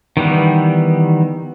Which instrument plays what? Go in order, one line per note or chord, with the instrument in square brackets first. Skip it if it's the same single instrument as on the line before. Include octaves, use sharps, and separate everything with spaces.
[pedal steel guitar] D#3 E3 G3 B3